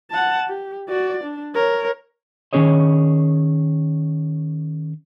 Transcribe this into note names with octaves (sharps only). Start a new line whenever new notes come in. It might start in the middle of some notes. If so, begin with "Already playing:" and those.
F#5 A5
G4
F#4 D5
D4
A#4 C#5
D#3 G#3 C#4 G#4 C#5 D#5